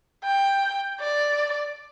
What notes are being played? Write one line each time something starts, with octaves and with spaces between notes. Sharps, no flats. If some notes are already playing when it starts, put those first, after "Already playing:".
G5
D5